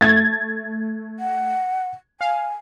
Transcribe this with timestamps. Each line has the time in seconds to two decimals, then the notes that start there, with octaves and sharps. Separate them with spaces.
0.01 A3 G#6 A6
1.20 F#5
2.21 F5 G#5